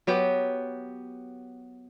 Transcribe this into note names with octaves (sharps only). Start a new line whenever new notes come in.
F#3 B3 G4